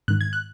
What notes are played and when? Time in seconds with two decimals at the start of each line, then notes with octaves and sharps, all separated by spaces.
0.08 G#2 D#3 F#6
0.21 G#6
0.33 F#6